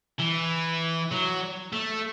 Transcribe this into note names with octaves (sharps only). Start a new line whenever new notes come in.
E3
F#3
A3